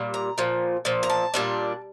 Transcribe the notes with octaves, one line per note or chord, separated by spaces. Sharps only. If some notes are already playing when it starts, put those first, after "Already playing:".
Already playing: A#2 G3
A#5
A#2 F3
A#2 F3
A#5
A5
A#2 G3 D4